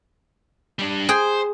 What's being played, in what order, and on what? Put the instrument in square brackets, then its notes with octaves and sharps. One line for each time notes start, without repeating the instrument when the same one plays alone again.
[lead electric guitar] G3 D4
[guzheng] G#4 G5 [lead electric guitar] C5